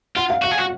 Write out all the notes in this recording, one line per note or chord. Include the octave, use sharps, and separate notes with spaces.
F4 F#5
F5
F#4 F#5
G#4
F#4